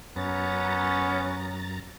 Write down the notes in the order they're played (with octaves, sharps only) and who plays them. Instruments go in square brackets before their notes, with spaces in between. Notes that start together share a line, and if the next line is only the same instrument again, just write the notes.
[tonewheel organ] F#2 A#5 A6 [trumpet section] B3 C#4